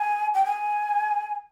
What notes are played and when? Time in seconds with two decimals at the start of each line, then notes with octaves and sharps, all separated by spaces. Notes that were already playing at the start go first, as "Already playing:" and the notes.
Already playing: G#5
0.34 G5
0.45 G#5